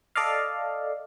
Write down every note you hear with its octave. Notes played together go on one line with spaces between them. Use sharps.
A4 D5 D#5 F5